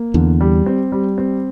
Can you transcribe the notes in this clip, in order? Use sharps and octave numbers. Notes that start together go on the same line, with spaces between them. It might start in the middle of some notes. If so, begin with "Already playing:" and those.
Already playing: A#3
E2 D3
G3
C4
G3
C4